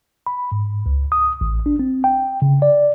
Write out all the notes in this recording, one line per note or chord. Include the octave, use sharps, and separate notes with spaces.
B5
G#2
C#2
D#6
A1
D4
C4
G5
C#3
D5